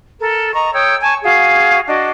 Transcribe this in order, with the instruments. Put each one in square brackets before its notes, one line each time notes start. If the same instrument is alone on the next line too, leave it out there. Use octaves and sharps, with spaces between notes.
[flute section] A4 A#4
D#5 A#5 C#6
C#5 G5 D#6 E6
G#5 A5 C#6
F#4 G#4 F5
D4 F#4 D#5